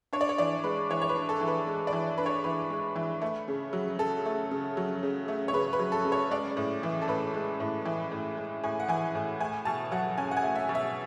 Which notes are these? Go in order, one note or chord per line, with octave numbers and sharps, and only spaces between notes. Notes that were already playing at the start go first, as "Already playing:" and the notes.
D4 C#5
D5
C#5
E3 D5
G#3 B4
E3 C#5
C#5
B4
D4
A4
E3
B4
G#3
D5
E3
D4 B4
C#5
E3 B4
G#3
E3
A3
C#3
F#3
C#3 A4
A3
C#3
F#3
C#3
A3
C#5
C#3 B4
B4
F#3
A4
C#3
C#5
G#3 D5
A2
E3
A4
A2 B4
G#3
A2
E3
A2
G#3
A2 G#5
F#5
E3 G#5
A2
A3 G#5
B2 A5
F#3 F#5
C#4 G#5
F#5
G#5
A3
E5
B2
E5